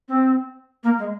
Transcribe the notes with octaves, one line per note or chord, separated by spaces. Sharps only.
C4
A#3
G#3